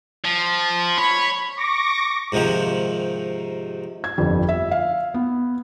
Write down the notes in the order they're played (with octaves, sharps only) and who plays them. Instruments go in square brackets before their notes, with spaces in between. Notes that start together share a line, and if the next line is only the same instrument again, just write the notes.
[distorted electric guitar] F3
[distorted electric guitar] C#5 [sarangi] B5
[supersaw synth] C#6 D6 A#6
[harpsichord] G#2 C3 D#3 F3
[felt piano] G#6
G1 F2 G3
E5
E5 F5
B3